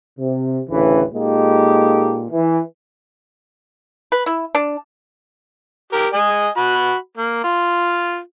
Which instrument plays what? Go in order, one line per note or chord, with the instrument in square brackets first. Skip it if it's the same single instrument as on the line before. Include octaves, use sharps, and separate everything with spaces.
[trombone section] C3
A1 D2 A2 C#3 E3 B4
A#2 G#3 A#3 D#4 G4 A4
E3
[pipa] B4
E4
D4
[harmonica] G4 A#4
D#5 G#5
F#4 B5
A#3
F4